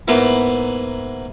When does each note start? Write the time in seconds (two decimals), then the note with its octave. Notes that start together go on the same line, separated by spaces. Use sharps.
0.08 G#2 A#3 B3 E4